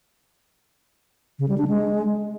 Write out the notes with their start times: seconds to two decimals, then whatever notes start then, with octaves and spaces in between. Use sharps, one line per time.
1.39 C#3
1.49 G3
1.58 D4
1.68 G#3